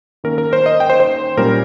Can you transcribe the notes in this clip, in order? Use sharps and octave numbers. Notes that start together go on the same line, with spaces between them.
D#3 A#3 C#4 A#4
A#4
C5
D#5
G5
C5
C5
A#2 G3 C#4 A#4